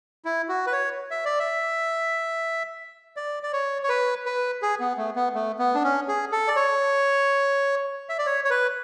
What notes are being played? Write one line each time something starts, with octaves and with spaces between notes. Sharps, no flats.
E4
F#4
B4
C#5
E5
D5
E5
D5
D5
C#5
C#5
B4
B4
G#4
B3
A3
B3
A3
B3
D4
C#4
G#4
A4
D5
C#5
E5
D5
C#5
C#5
B4